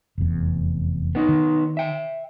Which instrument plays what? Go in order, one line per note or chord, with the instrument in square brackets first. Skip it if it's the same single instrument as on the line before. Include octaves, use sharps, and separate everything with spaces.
[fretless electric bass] F1 E2
[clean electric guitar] B3 D#4
[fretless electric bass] D#3
[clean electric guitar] E5 G5